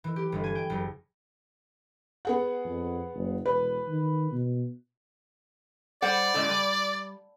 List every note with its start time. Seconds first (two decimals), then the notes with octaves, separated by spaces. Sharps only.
0.04 E3
0.16 G4
0.32 G1
0.44 G#5
0.55 G5
0.70 F#1
2.25 B3 G#4 F#5
2.65 F2
3.15 F#1
3.46 E1 B4
3.88 D#3
4.32 B2
6.02 G3 C5 D5 F#5
6.34 A2 C#3 G#3
6.48 G3